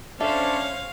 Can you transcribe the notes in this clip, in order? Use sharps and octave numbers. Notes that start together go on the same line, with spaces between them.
C#4 D4 A4 C5 C#5 E5 F5